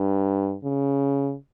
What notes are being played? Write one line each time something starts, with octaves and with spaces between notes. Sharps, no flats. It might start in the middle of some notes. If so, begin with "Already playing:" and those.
Already playing: G2
C#3